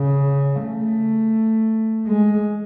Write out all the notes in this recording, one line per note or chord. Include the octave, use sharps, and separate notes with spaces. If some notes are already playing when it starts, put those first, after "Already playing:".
Already playing: C#3
A3
G#3